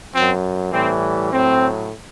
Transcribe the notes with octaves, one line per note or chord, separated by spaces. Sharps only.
F#2 F#3 C4
A2 E3 G3 C4
A2 F#3 C4